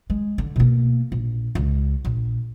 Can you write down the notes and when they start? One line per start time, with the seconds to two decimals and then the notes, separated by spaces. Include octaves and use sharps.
0.10 G#3
0.38 D3
0.56 B2 A#3
1.12 A#1
1.55 C#2
2.05 A#1